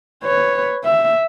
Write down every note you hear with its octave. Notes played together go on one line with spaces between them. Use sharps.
B4 C#5
E5